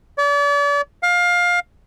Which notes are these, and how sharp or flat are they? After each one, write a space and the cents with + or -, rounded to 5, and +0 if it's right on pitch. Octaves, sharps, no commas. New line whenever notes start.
D5 -40
F5 +20